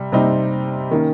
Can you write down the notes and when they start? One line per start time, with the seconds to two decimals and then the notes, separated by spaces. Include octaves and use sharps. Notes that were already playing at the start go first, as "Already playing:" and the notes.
Already playing: C3 G3
0.12 C3 G3 C4 D#4
0.91 D#3 A#3 C#4